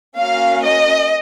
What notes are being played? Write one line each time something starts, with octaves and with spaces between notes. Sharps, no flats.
A#3 C#4 F#4 F5
D#5